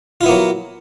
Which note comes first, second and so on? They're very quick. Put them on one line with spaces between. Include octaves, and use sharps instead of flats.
F4 E4 B3 A#3 F#3